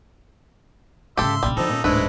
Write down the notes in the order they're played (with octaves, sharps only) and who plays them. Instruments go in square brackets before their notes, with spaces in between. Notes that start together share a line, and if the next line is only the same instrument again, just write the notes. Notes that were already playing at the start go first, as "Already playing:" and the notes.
[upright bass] G#2 C#3 [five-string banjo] G4 A4 [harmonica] E5 C6
[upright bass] A#1 C#3 [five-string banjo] G3
[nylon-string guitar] D3 F3 [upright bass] D#3 [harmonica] D#4 A4
[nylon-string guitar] A#2 C#4
[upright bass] D1 E2 [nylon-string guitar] G#2 D4 [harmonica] G#3 A3 E4 [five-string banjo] B4